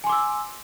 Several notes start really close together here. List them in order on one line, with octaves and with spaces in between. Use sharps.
G#5 C6 D6 E6